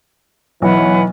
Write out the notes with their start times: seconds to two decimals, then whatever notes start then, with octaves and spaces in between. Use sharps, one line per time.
0.62 B1 E3 B4 C#5 F#5